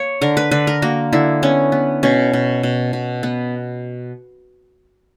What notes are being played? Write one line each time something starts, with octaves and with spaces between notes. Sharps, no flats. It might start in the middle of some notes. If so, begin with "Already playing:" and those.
Already playing: A#3 C#5
D3 A#4
B4
D3 B4
A#4
A#3 F#4
D3 E4
B3 C#4
B3
B2 C#4
B2
B2
B2
B3